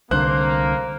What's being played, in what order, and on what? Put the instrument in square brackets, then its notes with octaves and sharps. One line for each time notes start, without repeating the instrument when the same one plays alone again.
[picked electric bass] C2 D3 [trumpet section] A#3 [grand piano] C5 F#6